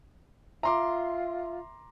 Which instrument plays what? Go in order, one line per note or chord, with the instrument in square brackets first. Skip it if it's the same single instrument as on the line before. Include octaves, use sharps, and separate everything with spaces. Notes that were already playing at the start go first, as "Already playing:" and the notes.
[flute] F4 [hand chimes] E5 [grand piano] A#5 C6 D6